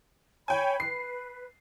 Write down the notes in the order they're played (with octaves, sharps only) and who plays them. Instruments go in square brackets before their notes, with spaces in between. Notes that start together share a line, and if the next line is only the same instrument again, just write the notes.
[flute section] C#5 B5 [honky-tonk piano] G5 G#5
[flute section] B4 [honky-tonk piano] C7